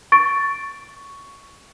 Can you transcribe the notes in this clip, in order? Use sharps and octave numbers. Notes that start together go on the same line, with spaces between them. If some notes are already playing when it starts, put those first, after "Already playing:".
C#6 A6 D7